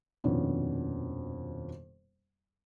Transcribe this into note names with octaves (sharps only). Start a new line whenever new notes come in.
D#1 F2 B2 D#3 C#4 D4